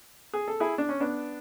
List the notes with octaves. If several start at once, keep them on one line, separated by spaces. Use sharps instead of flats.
G#4
A4
E4 G#4
D4
C#4
B3 D4